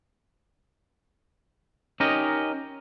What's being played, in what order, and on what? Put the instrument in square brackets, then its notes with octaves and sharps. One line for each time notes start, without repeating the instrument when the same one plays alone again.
[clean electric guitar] C#4 D#4 G4 A#4 D#5